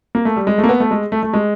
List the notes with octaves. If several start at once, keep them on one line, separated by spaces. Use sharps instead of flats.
A#3
A3
G3
G#3
A3
A#3
B3
A3
G#3
A3
A3
G#3